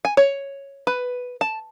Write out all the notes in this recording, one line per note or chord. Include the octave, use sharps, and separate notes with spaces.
G#5
C#5
B4
A5